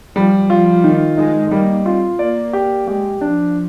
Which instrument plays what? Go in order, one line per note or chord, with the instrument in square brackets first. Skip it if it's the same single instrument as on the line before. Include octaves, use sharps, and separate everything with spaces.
[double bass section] F3 [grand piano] G3
[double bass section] F3 [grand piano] F4
[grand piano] D#3
[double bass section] G#3 [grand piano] D#4
[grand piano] G3 [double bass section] A#3
[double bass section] C4 [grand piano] F4
[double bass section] A#3 [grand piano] D5
[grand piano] G4
[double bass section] G#3 [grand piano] G4
[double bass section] F3 [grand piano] D4